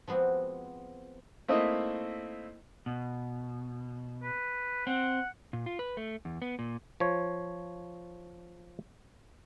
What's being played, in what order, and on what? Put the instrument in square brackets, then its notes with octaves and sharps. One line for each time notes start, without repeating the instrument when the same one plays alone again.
[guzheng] F3 G#3 B3 C4 F#4
[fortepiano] A3 A#3 C4 D#4 E4 D#5
[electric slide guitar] B2
[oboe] B4
[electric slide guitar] C4 [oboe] F#5
[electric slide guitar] A#2
F4
B4
A3
E2
B3
A#2
[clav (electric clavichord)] F3 C#5